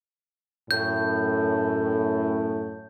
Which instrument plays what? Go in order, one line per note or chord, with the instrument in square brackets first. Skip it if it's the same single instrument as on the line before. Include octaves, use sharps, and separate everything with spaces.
[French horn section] F#2 A2 [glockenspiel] G6